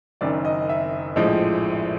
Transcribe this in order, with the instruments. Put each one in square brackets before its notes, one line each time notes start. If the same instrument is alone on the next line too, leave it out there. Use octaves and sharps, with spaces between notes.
[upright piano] F#1 F#2 D#3 D5
D#5
E5
A#1 A2 F3 G#3 D#5